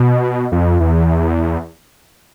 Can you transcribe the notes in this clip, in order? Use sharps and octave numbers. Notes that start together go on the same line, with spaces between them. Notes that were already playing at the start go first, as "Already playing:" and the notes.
Already playing: B2
F2
E2